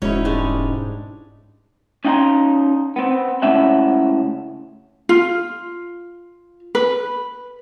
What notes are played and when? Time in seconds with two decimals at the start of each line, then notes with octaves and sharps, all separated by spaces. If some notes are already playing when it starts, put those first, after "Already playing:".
0.02 E1 G#2 F#3 C#4 D#4 E4 C#5
0.25 G3 G#3 D4
2.05 C#4 D#4 F5 F#5 A#5 C6
2.96 B3 C4
3.42 C#2 A2 C#3 C#4 E5 F#5
5.09 F4
6.75 B4